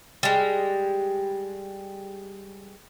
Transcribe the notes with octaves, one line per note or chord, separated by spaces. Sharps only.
G3 G#3